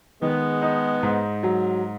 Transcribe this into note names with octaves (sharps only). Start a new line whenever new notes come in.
D#3 G#3 B3
D#4
G#2
F#3